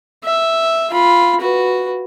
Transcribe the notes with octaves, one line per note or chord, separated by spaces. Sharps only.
E5
F4 B5
F#4 B4